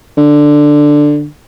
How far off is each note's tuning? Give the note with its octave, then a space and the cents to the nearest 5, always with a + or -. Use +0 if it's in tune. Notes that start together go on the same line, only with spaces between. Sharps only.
D3 +5